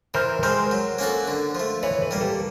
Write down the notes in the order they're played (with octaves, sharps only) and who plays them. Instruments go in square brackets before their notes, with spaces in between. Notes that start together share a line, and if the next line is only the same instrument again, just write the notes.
[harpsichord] E3 [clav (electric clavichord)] A#4 C5
[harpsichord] G#3 C4 [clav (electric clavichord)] A#4 C5
[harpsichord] F#3
A#3 C#4 F#4 A4
D3
F3 A3
[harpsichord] E3 [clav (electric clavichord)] B4 C#5
[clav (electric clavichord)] A4 B4
[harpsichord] G3 A#3
[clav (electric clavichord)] G4 A4